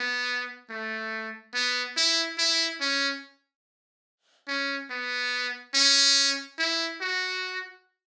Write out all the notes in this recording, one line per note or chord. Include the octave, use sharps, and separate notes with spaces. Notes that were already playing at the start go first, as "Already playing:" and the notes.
Already playing: B3
A3
B3
E4
E4
C#4
C#4
B3
C#4
E4
F#4